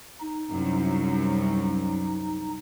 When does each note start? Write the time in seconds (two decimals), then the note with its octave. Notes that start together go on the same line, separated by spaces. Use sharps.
0.21 D#4
0.51 C2 F#2